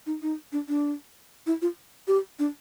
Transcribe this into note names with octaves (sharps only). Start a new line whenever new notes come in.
D#4
D#4
D4
D4
E4
F4
G4
D4